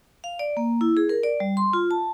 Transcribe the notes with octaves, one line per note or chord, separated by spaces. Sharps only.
F5
D5
A#3
E4
G#4
A#4
D5
G3
C6
F4
A5